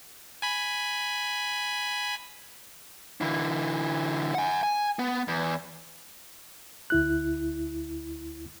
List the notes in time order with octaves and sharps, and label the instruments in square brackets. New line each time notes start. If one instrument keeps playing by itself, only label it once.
[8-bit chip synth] G#5 B5
[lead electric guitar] D3 E3
F#5 G#5
G#5
B3
E2
[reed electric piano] D2 E4 F#6